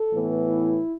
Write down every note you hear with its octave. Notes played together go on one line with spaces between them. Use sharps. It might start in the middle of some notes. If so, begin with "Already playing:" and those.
Already playing: A4
A2 E3 B3
E4